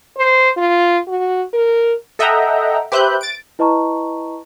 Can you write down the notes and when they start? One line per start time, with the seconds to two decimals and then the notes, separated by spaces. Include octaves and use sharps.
0.18 C5
0.57 F4
1.08 F#4
1.53 A#4
2.19 A4 D#5 E5 F#5 G5 A#5
2.92 G4 B4 C5 E5 F#6 G6
3.21 A6 D7
3.59 E4 B4 D#5 A5 A#5 C#6